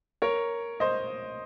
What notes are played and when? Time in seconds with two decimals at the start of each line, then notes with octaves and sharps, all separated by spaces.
0.22 A#4 C#5
0.80 C5 D#5